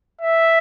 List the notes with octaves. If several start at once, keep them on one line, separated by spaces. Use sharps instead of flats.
E5